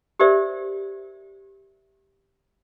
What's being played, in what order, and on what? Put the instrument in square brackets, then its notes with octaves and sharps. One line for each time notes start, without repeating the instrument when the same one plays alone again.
[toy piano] G4 A#4 C5 D5 E5